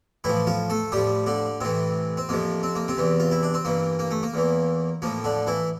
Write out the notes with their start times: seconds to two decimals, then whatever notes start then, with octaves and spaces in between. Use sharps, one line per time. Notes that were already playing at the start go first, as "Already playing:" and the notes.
0.24 A2 E3 F3 E4
0.47 F3 F4
0.70 A3 A4
0.92 A2 F3 G3 G4
1.26 D3 D4
1.61 A2 C3 E3 C4
2.17 C4
2.29 F2 C3 F3 A#3
2.63 C4
2.75 A#3
2.88 C3 C4
2.97 E2 E3
3.20 F4
3.31 E4
3.43 D4
3.54 C4
3.65 G2 E3 A#3
3.99 A#3
4.11 A3
4.23 A#3
4.34 E2 E3
5.02 A2 F3 A#3
5.24 D3 D4
5.47 E3 E4